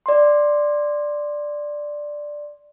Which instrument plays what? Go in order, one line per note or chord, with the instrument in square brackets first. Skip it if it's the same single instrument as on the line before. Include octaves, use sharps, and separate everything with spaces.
[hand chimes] D5 C6